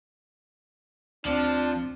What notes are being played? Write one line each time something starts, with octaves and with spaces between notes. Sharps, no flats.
D2 F3 C4 D4